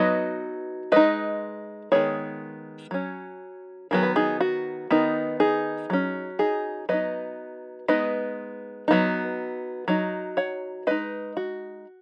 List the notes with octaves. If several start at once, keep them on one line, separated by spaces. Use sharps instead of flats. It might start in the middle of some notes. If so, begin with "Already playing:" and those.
Already playing: F#3 B3 D#4 B4 D#5
G#3 D#4 B4 D#5
D#3 G#3 B3 G#4 C#5
F#3 C#4
D#3 F#3 B3 G#4
B4
D#4 G#4
F#4
D#3 B3 D#4
D#4 G#4
F#3 C#4
D#4 G#4
F#3 B3 D#4 B4 D#5
G#3 B3 D#4 B4 D#5
F#3 B3 D#4
F#3 D#4
C#5 F#5
G#3 D#4 B4 D#5
F#4